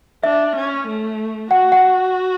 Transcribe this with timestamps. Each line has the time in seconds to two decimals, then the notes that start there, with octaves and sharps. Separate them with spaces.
0.24 D4 E5
0.56 C#4
0.87 A3
1.51 F#4 F#5
1.72 F#5